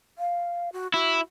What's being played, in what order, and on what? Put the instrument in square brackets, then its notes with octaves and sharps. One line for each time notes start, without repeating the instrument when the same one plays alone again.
[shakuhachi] F5
F#4
[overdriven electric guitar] E4 [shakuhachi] F#4